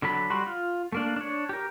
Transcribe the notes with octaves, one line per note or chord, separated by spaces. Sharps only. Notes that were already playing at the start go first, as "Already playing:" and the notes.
D3 F#3 A4 B5
G3 F#4 B5 C6
F4
A3 A#3 D4
D4 C#5
G4 A#4